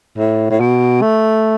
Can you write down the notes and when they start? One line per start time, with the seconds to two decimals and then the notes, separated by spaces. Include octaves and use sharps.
0.18 A2
0.50 A2
0.60 B2
1.02 A3